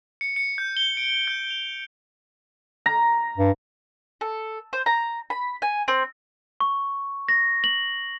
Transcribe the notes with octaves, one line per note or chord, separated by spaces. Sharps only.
C#7
C#7
G6
G7
D7
G6
F7
A#5
G2
A4
C5
A#5
B5
G#5
C4
C#6
A#6
F#7